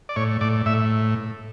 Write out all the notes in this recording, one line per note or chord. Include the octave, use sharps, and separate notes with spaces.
D5
A2 C#5
A2 D5
A2 E5